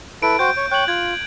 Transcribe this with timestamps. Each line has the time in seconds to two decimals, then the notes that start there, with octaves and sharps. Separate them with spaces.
0.23 E4 A4 B4 D7
0.39 F#4 C5 G5 G6
0.57 C#5
0.72 C#5 G5 F#6 F#7
0.88 F4 G#6